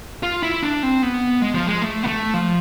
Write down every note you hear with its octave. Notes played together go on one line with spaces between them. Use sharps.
F4
E4
D4
C4
B3
G#3
F3
G#3
A3
B3
A3
F3